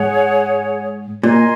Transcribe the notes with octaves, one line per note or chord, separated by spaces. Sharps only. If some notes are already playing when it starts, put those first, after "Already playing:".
Already playing: G#2 G#4 C#5 F#5
A#2 A#4 D#5 G#5 C6